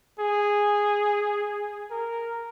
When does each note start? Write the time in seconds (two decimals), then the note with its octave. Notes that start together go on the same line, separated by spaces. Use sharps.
0.19 G#4
1.91 A#4